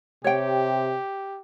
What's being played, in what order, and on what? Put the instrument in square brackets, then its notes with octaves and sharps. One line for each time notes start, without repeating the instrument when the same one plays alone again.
[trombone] C3 [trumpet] G4 [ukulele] C#5 G5